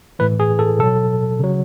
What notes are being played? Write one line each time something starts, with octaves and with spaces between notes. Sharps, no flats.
A2 E3 B4
G#4
A4
B2 F#3 A4
C#3 F#3